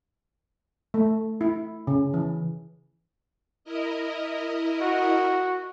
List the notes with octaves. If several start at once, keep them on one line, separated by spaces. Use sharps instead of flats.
A3
E4
C#3
E3
E4 A#4 D#5
F#4